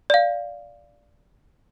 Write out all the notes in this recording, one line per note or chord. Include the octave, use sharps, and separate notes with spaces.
D5 F5